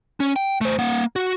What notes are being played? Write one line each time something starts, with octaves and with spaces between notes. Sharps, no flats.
C#4
G5
A3 C5
A#3 F#5
F#4